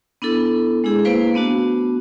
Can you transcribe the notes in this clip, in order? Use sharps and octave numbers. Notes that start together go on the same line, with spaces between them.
B3 D4 E4 A4
G#3 D4 E4 G#4
A#3 E4 B4 C5 F5 A#5
A3 B3 D4 F#4